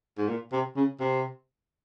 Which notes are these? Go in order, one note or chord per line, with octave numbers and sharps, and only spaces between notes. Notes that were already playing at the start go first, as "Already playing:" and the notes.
G#2
A#2
C3
C#3
C3